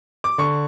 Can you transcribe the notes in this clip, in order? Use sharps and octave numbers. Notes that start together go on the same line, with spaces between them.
D6
D3 C#6